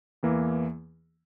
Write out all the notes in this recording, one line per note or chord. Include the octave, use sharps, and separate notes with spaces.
E2 E3 A#3